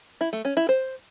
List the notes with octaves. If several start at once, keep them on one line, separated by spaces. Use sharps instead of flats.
E4
A3
C#4
E4
C5